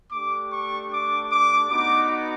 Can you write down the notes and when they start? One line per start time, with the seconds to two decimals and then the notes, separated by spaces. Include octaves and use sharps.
0.11 A3 D4 G4 D6
0.51 C#6
0.91 D6
1.31 D6
1.71 B3 D#4 F#4 D6